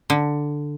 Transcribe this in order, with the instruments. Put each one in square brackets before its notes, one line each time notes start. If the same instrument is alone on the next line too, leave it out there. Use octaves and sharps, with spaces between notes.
[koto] D3